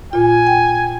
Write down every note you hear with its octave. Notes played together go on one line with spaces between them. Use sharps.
A#2 F4 G#5
G5